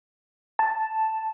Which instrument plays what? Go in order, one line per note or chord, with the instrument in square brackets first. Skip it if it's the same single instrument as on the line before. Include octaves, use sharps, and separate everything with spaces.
[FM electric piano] A5